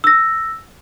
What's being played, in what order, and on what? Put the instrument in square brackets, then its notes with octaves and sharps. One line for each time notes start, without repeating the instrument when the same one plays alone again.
[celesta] E6 A#6